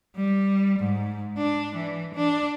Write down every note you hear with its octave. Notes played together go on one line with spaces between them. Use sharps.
G3
G#2
D4
E3
D4